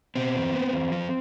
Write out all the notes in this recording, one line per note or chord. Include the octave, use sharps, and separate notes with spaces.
B2 C4
E2
B3
E2
F3